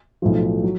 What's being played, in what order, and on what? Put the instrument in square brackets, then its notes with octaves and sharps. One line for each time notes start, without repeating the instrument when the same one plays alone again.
[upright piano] B1 A2 F3
F#3